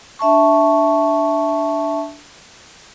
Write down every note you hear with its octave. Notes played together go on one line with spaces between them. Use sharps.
D4 E5 A5 C#6